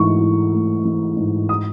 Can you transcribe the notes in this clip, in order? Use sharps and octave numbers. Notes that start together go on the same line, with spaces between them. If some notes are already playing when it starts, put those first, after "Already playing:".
Already playing: G#2 E3 A3 C#6
E4
A3
E3
G#2
D#6